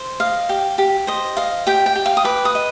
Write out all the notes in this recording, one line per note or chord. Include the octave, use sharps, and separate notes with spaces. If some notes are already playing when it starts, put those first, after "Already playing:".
Already playing: C5
D#5 F5
G4
G4
C5 D#5
D#5 F5
G4 G5
G5
G4
F5
D#6
B4 D6
D#6
D#5